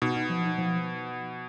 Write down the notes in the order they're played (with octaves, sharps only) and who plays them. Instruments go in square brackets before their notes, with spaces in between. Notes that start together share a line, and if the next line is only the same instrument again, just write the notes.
[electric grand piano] B2 [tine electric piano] D#4
[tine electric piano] D#4
F3
D#4
F3